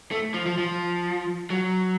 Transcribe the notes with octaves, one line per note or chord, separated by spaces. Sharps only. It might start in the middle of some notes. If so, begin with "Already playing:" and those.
A3
F3
F3
F3
F#3